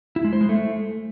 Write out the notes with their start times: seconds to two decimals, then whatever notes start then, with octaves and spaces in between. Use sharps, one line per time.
0.16 E4
0.24 G#3
0.33 C5
0.41 G#3
0.49 A3